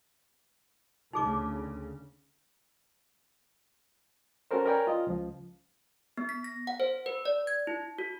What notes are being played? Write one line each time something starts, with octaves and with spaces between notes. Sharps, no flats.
D2 C#3 D#4 G#4 D6
C#4 F#4 A4 A#4 C5
A#4 B4 C#5 D5 G5 G#5
F4 D#5
C#2 F3
B3
B6
A#6
F#5
C5
B4
D5
G#6
E4
F#4